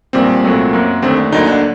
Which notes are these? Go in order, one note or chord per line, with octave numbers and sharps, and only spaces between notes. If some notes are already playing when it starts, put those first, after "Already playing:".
A#1 A#2 G3 C4
C2 A#2 F#3 A3
F#2 F#3 A#3
D#2 D3 A3 C4
D4
D2 D3 F#3 A#3 D#4
D4